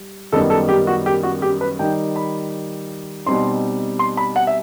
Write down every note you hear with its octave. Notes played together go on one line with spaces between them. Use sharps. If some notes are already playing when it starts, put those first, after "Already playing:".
Already playing: G3
F#2 D#3 G3 B3 D#4 A4
A4
G4
F#4
G4
F#4
G4
B4
D#3 G3 D#4 G5
B5
B2 G3 C4 D#4 C6
C6
B5
F#5
E5